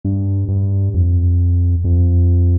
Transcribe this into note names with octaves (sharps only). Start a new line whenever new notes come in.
G2
G2
F2
F2